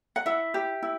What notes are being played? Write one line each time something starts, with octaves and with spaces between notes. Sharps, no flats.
F#5
E4 E5
G4
E4